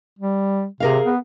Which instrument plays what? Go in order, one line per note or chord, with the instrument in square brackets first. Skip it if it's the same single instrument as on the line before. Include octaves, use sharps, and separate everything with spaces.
[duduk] G3
[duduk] C3 [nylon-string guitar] G#4 A#4 F5
[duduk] B3